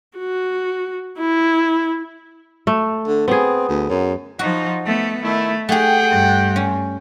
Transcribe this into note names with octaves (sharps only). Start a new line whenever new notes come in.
F#4
E4
A3
D3
B3 C4 G#4
D2
F#2
F3 D#4 F#4
A3 B3
D#3 A3 E4
A3 G4 G#4 F#5 G5
G2
C#4